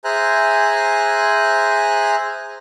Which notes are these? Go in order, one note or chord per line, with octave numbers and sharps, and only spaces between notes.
G#4 C5 E5 G#5 A#5 F#6